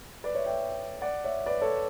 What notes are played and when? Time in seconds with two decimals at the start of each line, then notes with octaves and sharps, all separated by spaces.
0.24 B4 D5
0.35 C#5 E5
0.46 E5 G5
1.02 D5 F#5
1.24 C#5 E5
1.46 B4 D5
1.62 A4 C#5